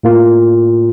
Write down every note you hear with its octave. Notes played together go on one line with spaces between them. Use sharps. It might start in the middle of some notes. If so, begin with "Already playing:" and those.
A2 A#3 F4